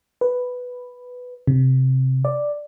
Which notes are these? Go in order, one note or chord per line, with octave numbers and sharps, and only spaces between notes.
B4
C3
D5